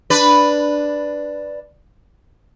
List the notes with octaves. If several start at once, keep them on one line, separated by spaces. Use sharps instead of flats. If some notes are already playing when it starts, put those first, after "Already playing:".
D4 B4 D5